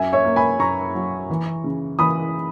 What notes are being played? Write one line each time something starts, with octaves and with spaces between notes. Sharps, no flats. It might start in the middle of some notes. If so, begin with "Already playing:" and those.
Already playing: F#2 E5 G#5
C#5 E5
A#3
G#5 B5
F#2 A#5 C#6
F#3
E3
C#3
E3 B5 D#6